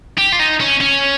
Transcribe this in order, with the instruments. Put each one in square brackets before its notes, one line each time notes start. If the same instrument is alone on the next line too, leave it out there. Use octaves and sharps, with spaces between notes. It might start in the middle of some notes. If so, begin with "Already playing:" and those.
[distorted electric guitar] G4
F4
D#4
C#4
C#4